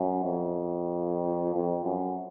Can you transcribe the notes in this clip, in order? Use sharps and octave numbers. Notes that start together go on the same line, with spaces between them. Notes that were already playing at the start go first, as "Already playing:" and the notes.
Already playing: F#2
F2
F2
F#2